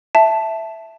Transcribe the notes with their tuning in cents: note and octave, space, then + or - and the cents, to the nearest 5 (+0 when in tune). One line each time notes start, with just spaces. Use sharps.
E5 +0 A5 +0